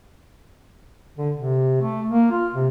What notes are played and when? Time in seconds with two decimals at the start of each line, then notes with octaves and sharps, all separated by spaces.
1.18 D3
1.35 C3
1.81 A3
2.09 A#3
2.31 F4
2.54 C3